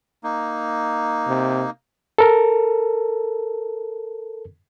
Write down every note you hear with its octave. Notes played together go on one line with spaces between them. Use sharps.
A#3 D#4
C3
A4 A#4